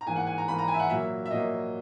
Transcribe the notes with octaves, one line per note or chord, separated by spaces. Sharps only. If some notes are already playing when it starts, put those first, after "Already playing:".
A#5
G#2 E3 A#3 G#5
F#5
G#5
A#5
G#2 E3 A#3 B5
A#5
G#5
E5
F#5
A#2 F#3 A#3 E5
E5
A#2 F#3 A#3 D#5